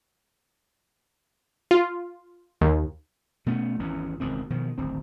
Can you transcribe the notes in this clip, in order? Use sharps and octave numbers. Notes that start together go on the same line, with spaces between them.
F4
D#2
B2 A3 B3 C#4
G#1 E2 E3 C#4
E1 C#2 D#3 C4
B2 D#3 F3
D1 G#1 C4